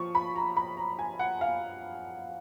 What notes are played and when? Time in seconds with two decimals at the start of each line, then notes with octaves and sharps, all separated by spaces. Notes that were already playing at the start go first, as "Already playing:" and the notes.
Already playing: F3 F4 C#6
0.15 B5
0.36 A#5
0.57 B5
0.77 A#5
0.99 G#5
1.19 F#5
1.41 F5